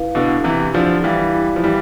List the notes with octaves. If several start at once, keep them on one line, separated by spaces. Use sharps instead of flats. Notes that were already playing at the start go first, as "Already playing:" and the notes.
Already playing: E4 B4 F5
B2 D3 E4
C3 E3 G4
D3 F3 D5
E3 G3 F5
E4
F3
E3 G3 G4